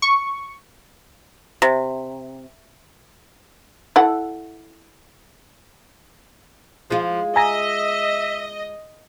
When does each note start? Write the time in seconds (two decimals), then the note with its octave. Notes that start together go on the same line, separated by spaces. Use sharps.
0.02 C#6
1.62 C3
3.96 E4 A4 F#5
6.90 F3 G#3 F4
7.36 D#5 E5 G#5 A#5 A#6